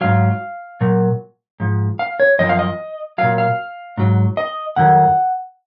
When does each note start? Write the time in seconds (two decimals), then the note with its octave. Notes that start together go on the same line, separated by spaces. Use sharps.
0.01 G#2 F#3 F5
0.81 A#2 F#3
1.60 G#2 F3
1.99 F5
2.20 C#5
2.39 F#2 F3 D#5
2.49 F5
2.59 D#5
3.18 A#2 F#3 F5
3.38 F5
3.97 G#2 F#3
4.37 D#5
4.76 F2 D#3 F#3 F#5